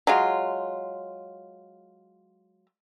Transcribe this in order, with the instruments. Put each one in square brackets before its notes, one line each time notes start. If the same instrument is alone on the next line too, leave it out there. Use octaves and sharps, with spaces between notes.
[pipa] F#3 G#3 F4